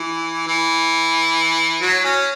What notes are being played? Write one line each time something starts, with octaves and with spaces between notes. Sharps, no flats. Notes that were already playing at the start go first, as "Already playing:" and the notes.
Already playing: E3
E3
F#3
C#4